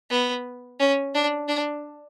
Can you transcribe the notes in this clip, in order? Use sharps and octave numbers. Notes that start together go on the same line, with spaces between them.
B3
C#4
D4
D4